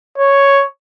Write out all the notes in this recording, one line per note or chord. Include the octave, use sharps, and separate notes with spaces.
C#5